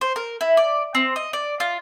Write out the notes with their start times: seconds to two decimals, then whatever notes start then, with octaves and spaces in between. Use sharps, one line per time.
0.01 C5
0.16 A#4
0.41 E4
0.57 D5
0.95 C4
1.16 D#5
1.33 D5
1.60 F4